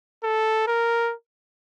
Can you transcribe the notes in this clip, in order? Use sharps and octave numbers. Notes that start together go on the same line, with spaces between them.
A4
A#4